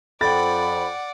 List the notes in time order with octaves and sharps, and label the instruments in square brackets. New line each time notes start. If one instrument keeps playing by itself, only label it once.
[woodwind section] F2 [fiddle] D5 F#5 [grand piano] G5 A6 [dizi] B5